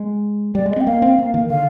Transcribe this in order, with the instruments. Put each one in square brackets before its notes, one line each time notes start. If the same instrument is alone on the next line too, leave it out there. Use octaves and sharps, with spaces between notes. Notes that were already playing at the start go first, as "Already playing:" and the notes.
Already playing: [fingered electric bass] G#3
[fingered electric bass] G3 [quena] D5
[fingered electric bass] G#3
[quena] D#5
[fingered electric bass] C4 [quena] G5
[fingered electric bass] A#3 [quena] F5
[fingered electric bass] C4
A#3
D#3
[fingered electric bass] D3 [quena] F5